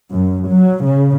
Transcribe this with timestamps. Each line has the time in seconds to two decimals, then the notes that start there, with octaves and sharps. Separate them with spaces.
0.11 F#2
0.47 F#3
0.85 C#3